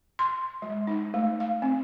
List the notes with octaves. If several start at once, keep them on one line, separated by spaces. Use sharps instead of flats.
C6
G#3
D#4
A3
F5
C4